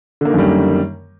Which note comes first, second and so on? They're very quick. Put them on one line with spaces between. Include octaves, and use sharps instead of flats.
D3 A#3 D#3 F#2 G3